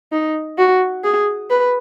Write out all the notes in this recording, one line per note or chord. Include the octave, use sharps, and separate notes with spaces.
D#4
F#4
G#4
B4